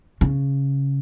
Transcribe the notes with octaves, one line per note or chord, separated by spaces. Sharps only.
C#3